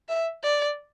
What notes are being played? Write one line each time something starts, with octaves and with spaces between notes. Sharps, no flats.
E5
D5